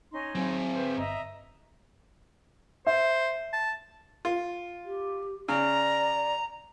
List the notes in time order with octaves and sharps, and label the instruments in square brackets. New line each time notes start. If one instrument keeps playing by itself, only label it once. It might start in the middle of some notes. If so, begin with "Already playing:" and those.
[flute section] C#4 D#4 C6
[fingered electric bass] F#3 [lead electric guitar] C4 G#4
[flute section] B4 C5 G5
[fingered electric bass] G1 [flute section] D#5 E5 A#5
[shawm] C5 [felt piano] E5
[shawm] A5
[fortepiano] F4
[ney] G4
[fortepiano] C#3 [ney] D5 [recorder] A#5